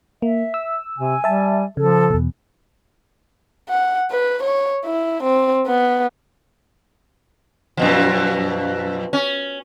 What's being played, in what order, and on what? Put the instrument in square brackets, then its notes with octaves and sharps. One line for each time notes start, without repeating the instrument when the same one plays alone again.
[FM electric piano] A#3 [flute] E5
[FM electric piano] E6
[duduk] C3 [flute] G#5
[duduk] G3 [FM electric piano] E5 A5
[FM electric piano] C#3 [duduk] F3 [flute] A4
[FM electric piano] E2 B2
[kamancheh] F#5
B4
C#5
E4
C4
B3
[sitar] F#2 B2 F3
C#4